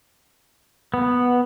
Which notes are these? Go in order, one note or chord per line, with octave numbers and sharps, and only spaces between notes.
B3